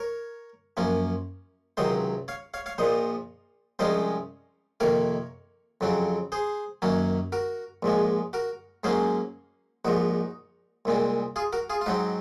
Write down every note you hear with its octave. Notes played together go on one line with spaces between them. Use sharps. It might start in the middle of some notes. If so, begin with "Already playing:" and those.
Already playing: A#4 C#5
F#2 F3 A#3 C#4
C#2 C3 D#3 F#3 C5 D#5
C#5 F5
C#5 F5
C#5 F5
A#1 A#2 F3 C5 D#5
C2 C3 F3 G#3 C#4 C5 D#5
F2 C3 D#3 A#3 A#4 C#5
F2 C#3 F#3 C4
G#4 C5
F#2 D#3 F#3 A#3 C#4
F#4 A#4
A#1 G#2 F3 G#3
F#4 A#4
G#2 F#3 A#3 C#4 G#4 C5
A#1 G#2 F3 D#4 F#4
C2 A#2 G#3 C4
F4 G#4
F#4 A#4
F4 G#4
F4
G#2 F#3 C4 D#4 F#4